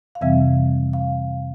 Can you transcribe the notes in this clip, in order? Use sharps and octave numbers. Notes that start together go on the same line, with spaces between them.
F5
F2 C3 E3 G3 C4 E5
F5